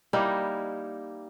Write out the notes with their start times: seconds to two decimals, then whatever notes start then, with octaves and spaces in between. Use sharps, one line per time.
0.13 G3 A#3 D#4 E4